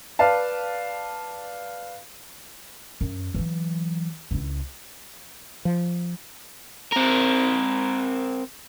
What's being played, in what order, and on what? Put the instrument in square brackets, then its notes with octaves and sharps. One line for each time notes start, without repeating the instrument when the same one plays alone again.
[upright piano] B4 D5 F5 A5
[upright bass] F#2
E3 F#3
C#2 E4
[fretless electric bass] F3
[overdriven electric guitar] C4 A#4